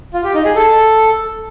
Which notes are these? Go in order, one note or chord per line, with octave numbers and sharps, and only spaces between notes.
F4
G4
D#4
G#4
A4